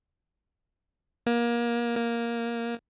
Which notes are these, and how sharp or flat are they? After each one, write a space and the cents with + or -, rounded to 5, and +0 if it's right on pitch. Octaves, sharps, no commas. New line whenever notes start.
A#3 +25
A#3 +5